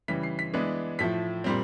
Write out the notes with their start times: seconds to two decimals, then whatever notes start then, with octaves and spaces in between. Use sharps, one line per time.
0.08 C#3 E3 G3 B6
0.23 C7
0.39 B6
0.53 E3 G#3 B3 D4
0.99 A2 F3 A3 B6
1.44 A#2 G3 C4